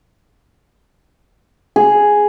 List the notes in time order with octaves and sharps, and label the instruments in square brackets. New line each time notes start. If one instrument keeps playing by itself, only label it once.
[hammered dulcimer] G#4